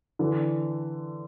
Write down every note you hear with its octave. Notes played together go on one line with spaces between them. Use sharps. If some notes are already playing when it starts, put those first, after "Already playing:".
D3 E3